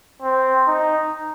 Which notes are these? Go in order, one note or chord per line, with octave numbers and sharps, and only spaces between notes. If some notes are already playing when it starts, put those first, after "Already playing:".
C4
D#4